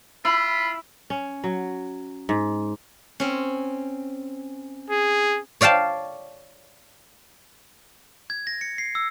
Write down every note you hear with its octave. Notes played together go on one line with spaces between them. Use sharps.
E4 F4 B5
C#4
F#3
G#2
C4 C#4
G#4
C#5 D5 F5 G5 A5
G#6
A#6
C#7
C7
E6